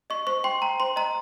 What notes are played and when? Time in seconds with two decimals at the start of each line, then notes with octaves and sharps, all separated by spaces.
0.10 D#5 C#6
0.27 C5 C#6
0.44 G5 C6
0.62 G5 A#5
0.80 C5 C6
0.96 D#5 A#5